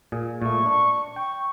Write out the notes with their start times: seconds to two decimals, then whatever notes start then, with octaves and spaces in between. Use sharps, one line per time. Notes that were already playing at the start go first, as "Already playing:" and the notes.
0.12 A#2 G#4
0.42 A#2 A3 C#6
0.66 D4
1.16 G5 C#6